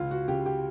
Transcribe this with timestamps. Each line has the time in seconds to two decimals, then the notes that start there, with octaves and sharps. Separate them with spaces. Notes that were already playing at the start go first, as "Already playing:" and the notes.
Already playing: C#2 F4
0.11 F#4
0.28 C#3 G4
0.46 G4